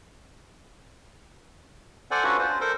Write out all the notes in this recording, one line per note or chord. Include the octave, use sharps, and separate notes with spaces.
A4 C5 D5 F#5 G#5
C#4 D4 F4 F#4 B4
C5
A4 A#4 C5